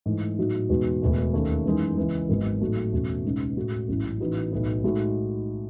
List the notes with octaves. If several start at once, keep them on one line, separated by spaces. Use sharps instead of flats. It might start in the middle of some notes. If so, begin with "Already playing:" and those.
G#2 E3 A3 E4
A2 F#3 B3 D#4 F#4
E2 B2 G#3 D#4 F#4
E1 E2 B2 A3
D#2 D#3 A3 C#4
F#2 E3 G#3 D#4
C#2 C#3 E3 G#3
G#1 G#2 D#3 F#3 B3
A2 F#3 A3 D#4 F#4
E2 B2 A3 C#4 F#4
C#2 B2 G#3 B3 D#4
A2 G#3 C#4 F#4
A1 G#2 F#3 C#4 E4
A2 E3 B3 D#4 F#4
B1 A2 F#3 B3 D#4
A2 G#3 D#4 F#4